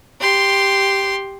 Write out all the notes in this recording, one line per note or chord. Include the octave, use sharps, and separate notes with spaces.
G4 C6